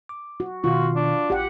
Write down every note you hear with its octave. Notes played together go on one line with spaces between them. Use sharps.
D6
F#4
B2 D#3 F4 F#4
D4
A1 G4 F#5